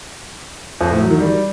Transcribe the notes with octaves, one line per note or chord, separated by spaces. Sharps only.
F2
A2
F#3
D#3
G3